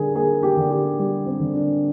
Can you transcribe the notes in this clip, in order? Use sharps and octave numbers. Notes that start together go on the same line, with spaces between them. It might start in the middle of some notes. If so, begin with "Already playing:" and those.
Already playing: D3 G3 G#4 A#4
A#3 G#4
G4
D3
G4
G3 G4
C4
D3
D4